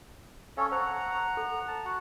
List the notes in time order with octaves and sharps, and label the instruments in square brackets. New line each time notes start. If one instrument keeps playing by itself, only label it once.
[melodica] C#4 A4 C#5 [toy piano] F5 C#6
[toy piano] C5 A5 [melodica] F#5 A#5
[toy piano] A4
[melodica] A5
F#4 F#5